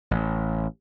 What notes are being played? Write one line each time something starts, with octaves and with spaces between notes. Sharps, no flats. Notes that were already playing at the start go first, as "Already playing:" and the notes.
A1